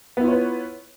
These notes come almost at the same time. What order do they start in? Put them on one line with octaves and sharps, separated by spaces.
B3 E4 F4 C#5 B4